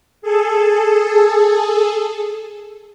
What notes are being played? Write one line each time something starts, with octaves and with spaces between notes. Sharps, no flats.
G#4 A4